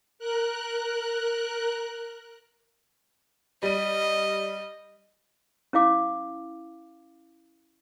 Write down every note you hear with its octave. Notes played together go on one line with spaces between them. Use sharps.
A#4 F#6
G3 D#5 D#7
C#4 E4 F5 D6